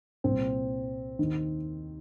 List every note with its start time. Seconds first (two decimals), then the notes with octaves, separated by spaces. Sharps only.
0.24 C2 A#2 C4
1.19 D#2 D#3